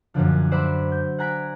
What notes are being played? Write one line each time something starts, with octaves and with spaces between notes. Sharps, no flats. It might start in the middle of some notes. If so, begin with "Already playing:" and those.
F#2 A#2 D3 F3
C5 D5 E5 F#5 B5
G6
F#5 G#5 A#5 F#6 B6 D7